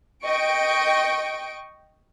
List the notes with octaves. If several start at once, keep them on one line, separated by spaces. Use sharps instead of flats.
D#5 G5 C#6 D7